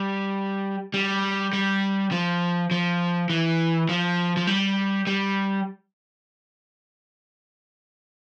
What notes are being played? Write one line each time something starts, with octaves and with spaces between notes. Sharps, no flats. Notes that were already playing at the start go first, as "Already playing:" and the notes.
Already playing: G3
G3
G3
F3
F3
E3
F3
F3
G3
G3